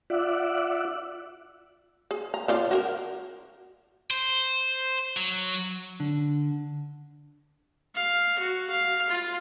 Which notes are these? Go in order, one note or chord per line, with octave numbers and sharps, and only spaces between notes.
F4 D5 E5 F#5
G#4
A#5
C#3 F4 D5
F#4 G4 A#4
C5
F#3
D3
F5
F#4
F5
F4